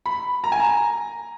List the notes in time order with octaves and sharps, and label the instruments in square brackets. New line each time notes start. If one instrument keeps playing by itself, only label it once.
[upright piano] B5
A#5
G#5
A#5